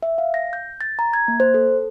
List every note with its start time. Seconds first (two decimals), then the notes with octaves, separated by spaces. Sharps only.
0.03 E5
0.18 F5
0.34 A#6
0.53 G6
0.81 A6
0.99 A#5
1.13 G#6
1.28 A#3
1.40 C5
1.54 A4